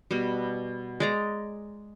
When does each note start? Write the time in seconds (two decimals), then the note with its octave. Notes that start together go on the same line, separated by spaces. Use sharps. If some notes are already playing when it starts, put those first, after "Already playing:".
0.11 B2 G3
1.00 G#3 D5 A#5